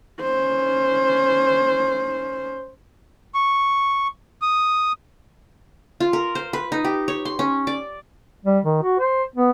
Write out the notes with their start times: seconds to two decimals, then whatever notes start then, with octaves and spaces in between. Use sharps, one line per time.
0.20 C#4 C5
3.34 C#6
4.42 D#6
6.00 F4
6.13 A#4
6.35 C5
6.53 B4
6.72 D#4
6.85 G4
7.08 C#5
7.25 C6
7.39 C#4
7.67 D5
8.45 G3
8.64 D#3
8.83 F#4
9.00 C5
9.35 B3